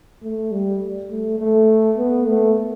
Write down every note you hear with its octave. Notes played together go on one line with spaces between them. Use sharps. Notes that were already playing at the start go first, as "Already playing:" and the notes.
A3
G3
A3
A3
B3
A3